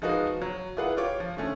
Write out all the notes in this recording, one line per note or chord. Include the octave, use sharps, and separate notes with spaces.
F3 G#3 D#4 F#4 B4 F5
F#3
E4 F4 G#4 B4 D5 F#5
F4 G4 C#5 D6
F3
D3 A3 C#4